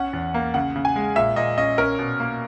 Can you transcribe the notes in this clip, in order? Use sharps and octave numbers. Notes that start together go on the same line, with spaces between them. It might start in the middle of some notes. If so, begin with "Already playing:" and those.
Already playing: C#4 F#5
E2
A#3
C#3 F#5
C#3
G#5
G#3
A#2 E5
A#2 D#5
C#4 D#5
C#4 A#4
B2
A#3